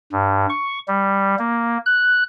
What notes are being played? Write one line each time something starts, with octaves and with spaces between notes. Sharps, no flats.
G2
C#6
G3
A#3
F#6